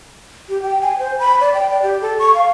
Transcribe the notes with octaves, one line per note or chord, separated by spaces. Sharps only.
G4
G5
G#5
C5
B5
D5
G5
D5
G4
A4
C#6
F5